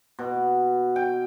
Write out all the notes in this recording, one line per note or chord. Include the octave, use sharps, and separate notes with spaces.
B2
G5